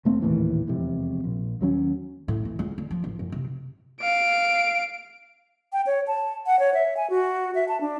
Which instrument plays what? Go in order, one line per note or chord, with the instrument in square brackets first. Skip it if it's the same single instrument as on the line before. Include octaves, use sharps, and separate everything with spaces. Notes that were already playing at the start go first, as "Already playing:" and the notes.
[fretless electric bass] E1 A3 C4
A#1 D#2 A2 E3
E1 F2 C3
A#1
D#2 F#3 A#3 C#4
[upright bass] A2
E3
C#2
D3
F3
A1
F#2
C3
[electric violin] F5 D7
[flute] G5
C#5
A5
F#5
C#5
E5
G#5
F#4
E5
A5
D4